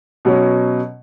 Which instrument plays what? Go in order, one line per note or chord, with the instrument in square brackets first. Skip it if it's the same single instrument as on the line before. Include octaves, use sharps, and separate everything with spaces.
[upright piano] B2 F#3 C#4